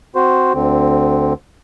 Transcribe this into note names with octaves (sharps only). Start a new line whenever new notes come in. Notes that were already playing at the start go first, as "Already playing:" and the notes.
C4 F#4 C5
D2 D3 C4